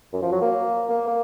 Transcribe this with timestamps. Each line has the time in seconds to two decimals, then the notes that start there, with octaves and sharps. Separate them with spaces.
0.13 F#2
0.22 F3
0.32 F#3
0.41 A#3
0.89 A#3
1.07 A#3